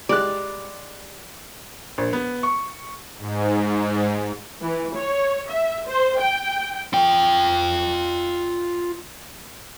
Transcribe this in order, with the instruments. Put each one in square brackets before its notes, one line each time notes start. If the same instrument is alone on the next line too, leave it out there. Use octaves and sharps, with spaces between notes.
[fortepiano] G3 G#3 F#6 [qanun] D5
[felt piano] A#1
B3
C#6
[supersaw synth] G#2
[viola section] E3
C#5
E5
C5
G5
[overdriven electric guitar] F4 G5